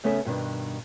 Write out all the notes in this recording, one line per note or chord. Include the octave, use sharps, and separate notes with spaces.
C#3 A3 B3 C#4 A4 E5
G2 B2 D#3 D4